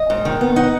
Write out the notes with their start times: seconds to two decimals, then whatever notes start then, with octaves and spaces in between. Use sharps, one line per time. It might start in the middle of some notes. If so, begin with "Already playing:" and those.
Already playing: D#5
0.10 G#2
0.25 D#3
0.41 B3
0.56 D#4 F#5